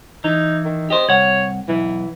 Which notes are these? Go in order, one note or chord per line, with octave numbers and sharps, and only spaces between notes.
E3 D#4
D#3
G4 C5 D#5
C2 C#5 F#5
B1 E3